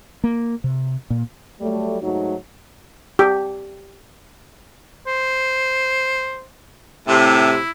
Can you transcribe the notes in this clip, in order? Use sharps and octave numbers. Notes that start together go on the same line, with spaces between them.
A#3
C3
A#2
F#3 G3 A3
G#2 F#3 A3 D#4 F#4
G4
C5
A2 C3 E4